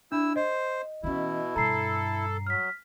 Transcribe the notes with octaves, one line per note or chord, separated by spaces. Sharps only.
D4 E4 E6
C5 D#5
B2 E3 C#4 E4
G2 B2 A4 A#5 C7
F#3 F6 B6